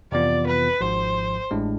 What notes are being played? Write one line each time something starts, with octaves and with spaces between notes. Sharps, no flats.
F2 C3 E3 B3 F4 D5
B4
G#1 G#2 F3 C5
A1 A2 G#3 D4